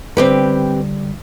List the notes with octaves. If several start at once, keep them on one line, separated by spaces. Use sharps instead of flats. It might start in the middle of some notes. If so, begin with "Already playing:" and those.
D3 G3 C4 G4 B4